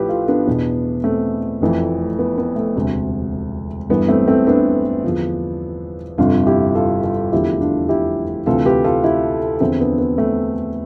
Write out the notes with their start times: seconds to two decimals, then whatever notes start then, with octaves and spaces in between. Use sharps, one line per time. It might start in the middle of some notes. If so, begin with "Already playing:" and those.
Already playing: A1 A2 F3 G4 B4
0.09 F4 A4
0.28 B3 D4
0.47 E2 B2
1.04 A3 C4
1.61 F1 F2 E3
2.19 B3
2.38 B3
2.56 A3
2.75 E1 D2 C3
3.89 G1 G2 E3 B3
4.08 A3 C4
4.27 A3 C4
4.47 B3 D4
5.04 E2 D3 F3
6.18 G1 F2 C3 D4 F4
6.46 E4 G4
6.75 F4 A4
7.03 F4 A4
7.32 F1 E2 D3 F3 E4 G4
7.61 D4 F4
7.89 E4 G4
8.46 D2 C3 E3 F4 A4
8.65 G4 B4
8.84 F4 A4
9.04 E4 G4
9.60 E2 D3 F3 C4 E4
9.79 B3 D4
9.98 B3
10.18 A3 C4